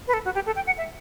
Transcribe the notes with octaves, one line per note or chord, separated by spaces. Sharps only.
B4
A4
F#4
G4
A4
G5
F#5
E5